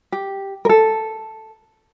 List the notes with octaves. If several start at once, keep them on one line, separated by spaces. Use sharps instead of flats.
G4
A#4
A4